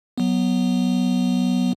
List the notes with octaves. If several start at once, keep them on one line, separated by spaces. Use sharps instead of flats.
F#3 B3